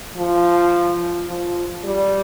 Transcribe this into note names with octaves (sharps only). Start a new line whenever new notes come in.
F3
F3
G3